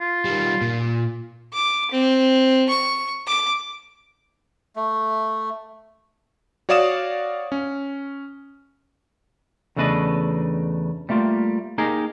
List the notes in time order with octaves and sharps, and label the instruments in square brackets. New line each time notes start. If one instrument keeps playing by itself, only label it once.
[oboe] F4
[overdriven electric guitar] D#3 G3
A#2
[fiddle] D6
C4
C#6
D6
[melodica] A3
[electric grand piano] F#4 C#5 D5 F5 D#6 E7
C#4
[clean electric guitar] E2 C#3 A3 D4 B4 D#5
G3 A3 A#3 F4
A#3 D#4 G4 G#4 A#4